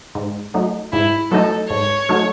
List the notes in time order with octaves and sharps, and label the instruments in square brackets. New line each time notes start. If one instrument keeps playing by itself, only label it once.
[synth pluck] G#2
F#3 A3 D#4
[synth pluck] G#2 [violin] E4
[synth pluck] F#3 A3 D#4 [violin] A4
[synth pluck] G#2 [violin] C#5
[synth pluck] F#3 A3 D#4